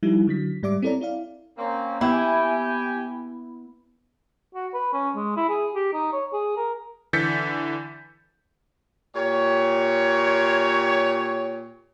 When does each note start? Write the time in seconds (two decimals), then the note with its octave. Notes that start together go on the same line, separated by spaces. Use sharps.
0.03 F3 G3 D#4 E4
0.27 D3 F#3 B6
0.63 G#2 G3 D5 E5 D6
0.82 C4 E4 A4 C#5 D5 A#5
1.01 E4 D5 F5
1.58 A#3 C4 C#4
2.01 B3 E4 G4 G5 G#5
4.55 F#4
4.74 B4
4.94 C#4
5.16 G#3
5.36 E4
5.49 G#4
5.75 G4
5.93 D#4
6.13 C#5
6.33 G#4
6.57 A#4
7.13 D3 E3 G6 A6 B6 C#7
9.15 A#2 G4 C#5